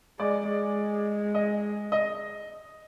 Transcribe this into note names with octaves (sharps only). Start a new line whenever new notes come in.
G#3 D5
G#3
D#5
D#5